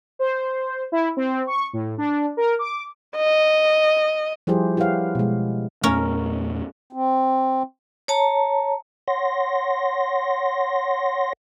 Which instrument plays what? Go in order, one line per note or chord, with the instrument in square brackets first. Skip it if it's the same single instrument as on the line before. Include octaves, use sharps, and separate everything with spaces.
[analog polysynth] C5
E4
C4
C#6
A2
D4
A#4
D6
[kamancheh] D#5
[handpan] F3 G3 E4 G4 G#4 C5
E4 G4 B4 C#5 F5 F#5
B2 G#3
[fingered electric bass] E2 A#2 A3 [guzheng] C#4 A#4
[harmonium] C4
[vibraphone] C#5 A5 A#5
[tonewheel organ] C#5 F#5 C6 A#6